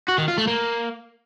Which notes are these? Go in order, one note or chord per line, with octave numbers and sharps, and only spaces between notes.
F#4
D#3
F4
A3
A#3